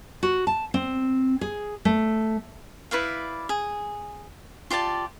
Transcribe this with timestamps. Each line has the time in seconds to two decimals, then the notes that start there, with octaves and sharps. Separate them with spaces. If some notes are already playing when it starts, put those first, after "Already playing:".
0.23 F#4
0.47 A5
0.74 C4
1.41 G#4
1.85 A3
2.91 E4 B4 D5 F5
3.49 G#4
4.70 F4 G4 D5 A5